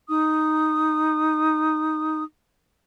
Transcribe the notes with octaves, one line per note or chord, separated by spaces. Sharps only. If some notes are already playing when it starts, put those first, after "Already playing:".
D#4 D#6